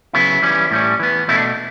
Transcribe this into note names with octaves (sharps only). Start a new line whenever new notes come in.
C#3 F#3 B3 E4
E3 G3 C#4
A2 G3 C#4
E3 B3
B2 A3 C#4 E4
D4